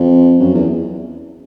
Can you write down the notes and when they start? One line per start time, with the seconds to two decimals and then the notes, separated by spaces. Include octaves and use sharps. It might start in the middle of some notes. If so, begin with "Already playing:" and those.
Already playing: F2
0.40 F#2
0.54 E2